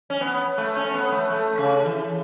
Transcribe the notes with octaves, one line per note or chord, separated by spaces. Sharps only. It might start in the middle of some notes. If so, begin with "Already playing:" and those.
C#4
B3
A3
C#4
B3
A3
A3
C#3
E3